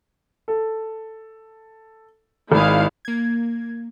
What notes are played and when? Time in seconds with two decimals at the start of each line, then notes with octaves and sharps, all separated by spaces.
0.48 A4
2.52 G#1 G#3 E4 F5
3.05 A#3 G#6